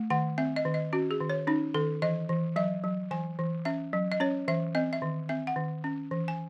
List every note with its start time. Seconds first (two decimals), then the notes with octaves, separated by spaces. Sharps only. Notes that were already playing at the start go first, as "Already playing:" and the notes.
Already playing: A3
0.10 D#3 F#5
0.38 C4 E5
0.56 D#5
0.65 D#3
0.74 D#5
0.93 C#4 F#4
1.11 G#4
1.20 D#3
1.29 C#5
1.47 C#4 D#4
1.74 D#3 A4
2.02 E3 D#5
2.29 E3
2.56 F#3 E5
2.84 F#3
3.11 E3 G#5
3.39 E3
3.65 C#4 E5
3.93 F#3
4.12 D#5
4.20 C#4 C#5
4.48 E3 E5
4.75 C4 D#5
4.93 E5
5.02 D#3
5.29 C4 E5
5.47 F#5
5.56 D#3
5.84 C#4
6.11 E3
6.28 G#5